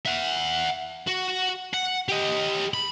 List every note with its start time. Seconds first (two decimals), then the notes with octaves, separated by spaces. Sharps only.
0.06 E5 F#5
1.07 F#4
1.74 F#5
2.09 G4 D#5
2.74 B5